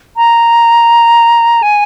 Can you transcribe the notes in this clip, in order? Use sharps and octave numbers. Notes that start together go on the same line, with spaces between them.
A#5
G#5